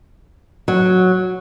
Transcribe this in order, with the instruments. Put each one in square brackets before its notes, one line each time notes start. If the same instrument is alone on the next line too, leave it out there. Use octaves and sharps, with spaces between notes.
[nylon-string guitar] F#3